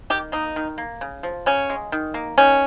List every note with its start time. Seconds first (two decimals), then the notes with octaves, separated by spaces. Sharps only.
0.10 D#3 G4
0.32 A#3 D#4
0.56 D#3
0.78 A#3
1.01 C#3
1.23 F3
1.46 C#3 C#4
1.70 G#3
1.92 D#3
2.14 A#3
2.38 D#3 C#4